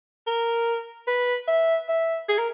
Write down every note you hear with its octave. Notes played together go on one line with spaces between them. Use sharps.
A#4
B4
E5
E5
G#4
A#4